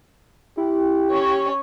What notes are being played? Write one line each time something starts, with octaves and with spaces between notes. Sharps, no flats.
E4 G4
C#4 C#5